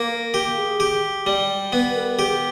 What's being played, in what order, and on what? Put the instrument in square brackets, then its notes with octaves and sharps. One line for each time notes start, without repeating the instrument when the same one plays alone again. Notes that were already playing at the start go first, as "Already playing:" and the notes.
Already playing: [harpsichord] A#3
[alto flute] A#4
[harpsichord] G4 [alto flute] A#4
[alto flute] G#4
[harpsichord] G4
G3
[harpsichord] B3 [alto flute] B4
[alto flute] A#4
[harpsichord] G4 [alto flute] G#4